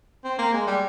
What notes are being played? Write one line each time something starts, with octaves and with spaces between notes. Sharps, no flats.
C4
A#3
G#3
G3